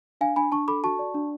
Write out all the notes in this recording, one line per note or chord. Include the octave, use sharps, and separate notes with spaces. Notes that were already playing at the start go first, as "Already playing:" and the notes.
D4 F5 G#5
D4 G#5 B5
D4 A5 C#6
A4 B5 D6
F#4 A5 C#6
D5
D4